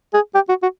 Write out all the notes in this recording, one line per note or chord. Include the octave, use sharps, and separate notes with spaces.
G#4
G4
F#4
F#4